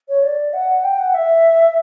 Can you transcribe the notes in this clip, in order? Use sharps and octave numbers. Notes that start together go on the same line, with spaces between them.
C#5
D5
F#5
G5
F#5
E5